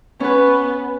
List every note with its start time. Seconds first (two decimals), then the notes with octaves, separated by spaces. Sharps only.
0.20 B3 C#4 B4